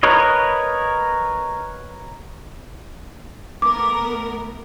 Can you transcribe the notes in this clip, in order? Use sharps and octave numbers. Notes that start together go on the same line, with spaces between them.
A#4 B4 C#5 D#5
A3 B3 A#4 D6